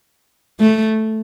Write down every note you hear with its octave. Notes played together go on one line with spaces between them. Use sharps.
A3